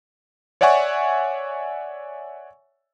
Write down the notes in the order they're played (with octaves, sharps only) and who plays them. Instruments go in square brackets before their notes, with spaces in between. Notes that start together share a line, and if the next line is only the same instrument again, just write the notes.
[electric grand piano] C#5 D5 E5 F#5 G#5 C#6